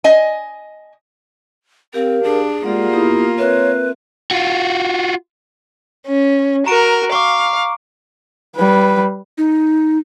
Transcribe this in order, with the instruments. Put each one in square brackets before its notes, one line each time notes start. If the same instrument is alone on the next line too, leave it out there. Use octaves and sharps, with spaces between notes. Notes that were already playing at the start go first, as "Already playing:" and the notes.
[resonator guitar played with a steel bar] D#5 G#5
[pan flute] C4 [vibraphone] G4 F5 [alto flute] A#4
[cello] D4 [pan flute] G#4
[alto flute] G#3 [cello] A#3 F4 [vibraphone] G4 D5 F#5
[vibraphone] B3 G4 D#6 [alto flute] E4
[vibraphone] C4 A#4 E5 [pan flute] B4 [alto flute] C#5
[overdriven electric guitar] F4 F#4
[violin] C#4
[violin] F#4 A#4 [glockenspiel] A#5 D7
[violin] F5 [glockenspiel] C#6 D6
[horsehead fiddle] G3 B4
[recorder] D#4